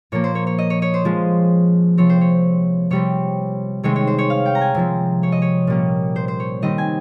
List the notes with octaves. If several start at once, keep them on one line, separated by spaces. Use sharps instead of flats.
A#2 F3 A#3 C#5
C5
C#5
C#5
D#5
C#5
C#5
C5
F3 G#3 C#4
C3 F3 C4 C#5
C5
C#5
C3 G3 C4 C#5
C3 D#3 G#3 C4 C#5
C#5
C5
C#5
F5
G5
A#5
G#5
C3 F3 C4
C#5
D#5
C#5
A#2 G3 A#3 C#4
C5
C5
C#5
D#3 G3 C4 D#5
G#5